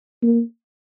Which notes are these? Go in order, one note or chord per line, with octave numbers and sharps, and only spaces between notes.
A#3